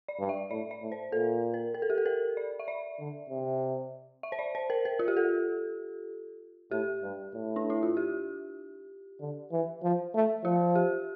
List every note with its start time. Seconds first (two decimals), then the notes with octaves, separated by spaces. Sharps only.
0.08 D5
0.19 G2
0.29 E5
0.51 A2 D5
0.71 D5
0.81 A2
0.92 C5
1.12 A#2 A4
1.54 A#4
1.74 A#4
1.82 A4
1.90 G4
1.98 A4
2.06 A#4
2.37 D5
2.59 E5
2.68 D5
2.99 D3
3.30 C3
4.23 E5
4.32 C5
4.39 D5
4.55 C5
4.70 A#4
4.85 A#4
4.99 F4
5.08 G4
5.17 A4
6.71 A2 G4
7.03 G2
7.34 A2
7.56 D4
7.70 E4
7.83 F4
7.97 G4
9.20 D3
9.52 E3
9.83 F3
10.14 A3
10.44 F3 F4
10.75 G4